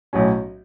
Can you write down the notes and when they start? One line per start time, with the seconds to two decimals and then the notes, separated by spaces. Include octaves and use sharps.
0.13 B1 A2 F#3 C#4